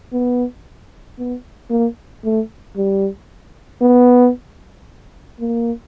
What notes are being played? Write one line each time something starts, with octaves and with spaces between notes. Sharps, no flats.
B3
B3
A#3
A3
G3
B3
A#3